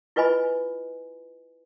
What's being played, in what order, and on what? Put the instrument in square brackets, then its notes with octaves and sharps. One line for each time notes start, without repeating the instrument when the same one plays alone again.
[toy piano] E4 F4 B4 D#5 G#5 B5